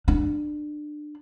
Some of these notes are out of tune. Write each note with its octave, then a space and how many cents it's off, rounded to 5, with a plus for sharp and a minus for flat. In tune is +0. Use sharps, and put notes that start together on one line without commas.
D4 +25